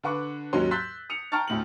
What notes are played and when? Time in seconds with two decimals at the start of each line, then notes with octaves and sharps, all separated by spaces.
0.03 D3 B4 F#5 C#6 D6
0.53 D#2 G#2 F#3 C#4 C6
0.71 C6 E6 F#6 G6 A6 B6
1.10 D#6 C#7 F7
1.32 G5 A5 A#5 C#6 F6 A6
1.48 D2 A2 F#7